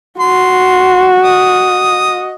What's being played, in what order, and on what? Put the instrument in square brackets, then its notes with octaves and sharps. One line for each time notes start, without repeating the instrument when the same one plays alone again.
[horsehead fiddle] F#4 [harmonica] C6
[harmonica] D#5 D#6